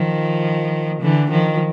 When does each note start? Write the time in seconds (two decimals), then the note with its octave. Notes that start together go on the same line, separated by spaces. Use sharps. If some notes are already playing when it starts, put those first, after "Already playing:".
Already playing: D#3 F3
1.02 D3 E3
1.30 D#3 F3